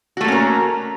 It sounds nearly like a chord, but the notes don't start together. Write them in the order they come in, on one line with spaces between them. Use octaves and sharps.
F#4 A3 A#3 C#4 A#4